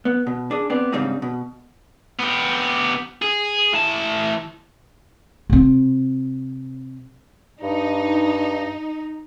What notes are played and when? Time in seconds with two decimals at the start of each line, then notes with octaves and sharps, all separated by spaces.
0.05 B3
0.27 B2
0.51 D4 G#4
0.70 B3 C4 D5
0.92 G#2 C#3 G3 C4 D4 D#4
1.22 B2
2.20 B3 G4
3.22 G#4
3.73 E3 A5
5.49 C3 C4
7.62 G2 D#4